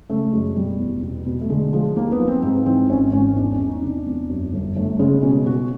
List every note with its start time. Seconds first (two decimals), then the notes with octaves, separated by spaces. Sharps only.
0.10 C#3 A3
0.33 F#2 G#3
0.56 B2 G3
0.80 E2
1.03 B2
1.26 B2
1.41 A3
1.50 D3 G#3
1.73 F3 G#3
1.96 D#2 A#3
2.12 B3
2.19 F3
2.28 C4
2.42 G#2 C4
2.66 E3 C4
2.89 G#1 C#4
3.13 G#1 C#4
3.36 E2 D4
3.52 C#4
3.60 E2
3.67 D#4
3.82 C3 D4
4.06 E2
4.29 F#2
4.53 G1
4.76 G1 A3
4.99 C#3 G#3
5.22 B2 C#4
5.46 B2 F#4